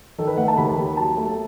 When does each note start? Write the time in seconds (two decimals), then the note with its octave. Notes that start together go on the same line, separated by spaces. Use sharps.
0.18 D#3 A4
0.27 B4
0.37 A3 F#5
0.48 A5
0.57 D#2 B5
0.77 D#2
0.97 F#3 A5
1.17 A3